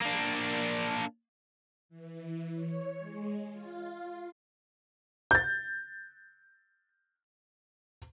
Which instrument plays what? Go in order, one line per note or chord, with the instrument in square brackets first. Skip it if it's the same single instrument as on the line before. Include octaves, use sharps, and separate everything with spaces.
[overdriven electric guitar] A#3 D4
[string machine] E3
C#5
G#3
F4
[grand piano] G6 A6